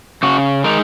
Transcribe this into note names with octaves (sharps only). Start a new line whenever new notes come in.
C#3 F#4
G#3 D#4 A#4